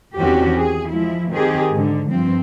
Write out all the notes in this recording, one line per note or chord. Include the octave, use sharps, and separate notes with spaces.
E2 D#3 C4 C#4 F#4 G4
G#4
F3 G#3 E4
D#3 C4 G4 G#4
G#2 D3
G2 F3 C4